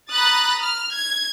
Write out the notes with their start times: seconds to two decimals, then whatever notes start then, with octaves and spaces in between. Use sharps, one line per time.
0.10 A#5 B5 D#6 F#6 A6
0.62 F6
0.94 G#6